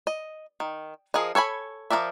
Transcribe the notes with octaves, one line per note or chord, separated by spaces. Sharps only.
D#5
D#3
F3 G#4 A#4 D#5
A4 C#5 G#5 B5
F3 D4 A#4 D5 E5